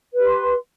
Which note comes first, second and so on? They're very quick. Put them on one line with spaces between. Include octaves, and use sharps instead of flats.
B4 G4 C6